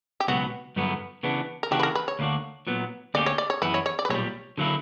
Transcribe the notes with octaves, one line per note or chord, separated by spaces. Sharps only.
G4
C#2 B2 F#3 B3 F#4
G2 D3 F#3 B3
C#3 E3 B3 D4
A#4
C#3 E3 A#3 D4 F#4 G4
B4
A#4
B4
C#5
D2 D3 A#3 D4 F#4
A#2 F#3 B3
D2 D3 A#3 C#4 G4 D5
C#5
D5
C#5
F#2 E3 B3 E4 B4
C#5
C#5
D5
B4
B1 A#2 G3 C#5
D3 F#3 A#3 E4